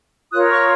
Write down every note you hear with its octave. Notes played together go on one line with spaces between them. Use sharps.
F4 A#4 C#5 D#6 F#6
C#6 F6